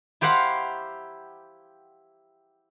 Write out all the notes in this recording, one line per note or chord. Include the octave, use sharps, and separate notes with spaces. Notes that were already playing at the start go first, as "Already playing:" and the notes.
E4 G4 C5 F5 F#5 A#5